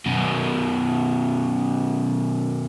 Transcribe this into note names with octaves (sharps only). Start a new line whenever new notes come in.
F#2 B2